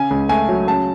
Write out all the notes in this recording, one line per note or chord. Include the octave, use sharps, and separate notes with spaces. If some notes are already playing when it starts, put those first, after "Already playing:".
Already playing: C#3 G#5
C#2
A3 G#5
F#3
C#3 A5